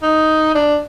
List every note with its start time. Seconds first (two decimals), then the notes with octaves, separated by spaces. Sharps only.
0.02 D#4
0.55 D4